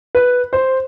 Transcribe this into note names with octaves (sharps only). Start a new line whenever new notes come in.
B4
C5